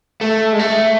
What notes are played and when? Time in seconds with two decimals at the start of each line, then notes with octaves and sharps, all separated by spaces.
0.21 A3
0.53 G#3
0.59 A3